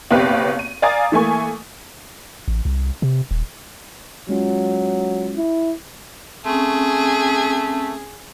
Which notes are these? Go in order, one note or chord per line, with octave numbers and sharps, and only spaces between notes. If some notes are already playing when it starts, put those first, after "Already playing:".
F#1 B1 C4 G4 B4 F5
D#7
D5 F5 G#5 A#5 D#6 A6
E3 A3 A#3 G#5 C#6
A1
C2
C3
D#1
F#3 G#3 C#4 F4
E4
A3 C4 C#4 G#4